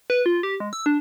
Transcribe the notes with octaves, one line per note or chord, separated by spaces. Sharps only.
B4
F4
G4
G#3
E6
D4